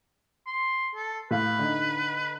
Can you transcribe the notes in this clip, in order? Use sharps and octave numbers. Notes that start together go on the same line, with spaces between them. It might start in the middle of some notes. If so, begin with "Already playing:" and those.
C6
A4
A2 B4 F5
D3 D#4